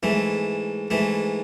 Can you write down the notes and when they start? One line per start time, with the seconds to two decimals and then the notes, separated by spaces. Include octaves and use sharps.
0.03 G#2 E3 A3
0.91 G#2 E3 A3